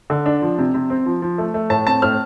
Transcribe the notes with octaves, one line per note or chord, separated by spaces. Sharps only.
D3
D4
F3
C3
C3
C4
F3
F3
A3
A3
A2 A5
C4 A5
A2 F6